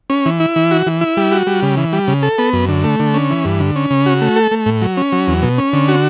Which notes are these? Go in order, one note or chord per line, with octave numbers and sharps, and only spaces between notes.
C#4
E3
E4
E3
F#4
E3
E4
G3
F#4
G3
C#3
E3
G3
C#3
A4
B3
F#2
D3
A3
D3
C#4
E3
G2
D3
C#4
C#3
F#4
A3
A4
A3
A2
F#3
C#4
F#3
E2
B2
C#4
D3
F#4